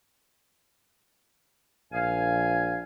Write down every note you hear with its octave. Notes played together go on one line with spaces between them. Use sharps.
A#1 F5 G#5